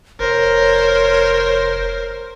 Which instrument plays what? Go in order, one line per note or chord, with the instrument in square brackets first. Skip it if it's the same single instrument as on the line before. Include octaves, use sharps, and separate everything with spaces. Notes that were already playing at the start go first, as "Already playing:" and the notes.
[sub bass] F1 [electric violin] A#4 C5 [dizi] C#5